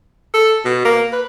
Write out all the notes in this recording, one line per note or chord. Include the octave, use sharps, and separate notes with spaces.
A4
B2
A#3
B4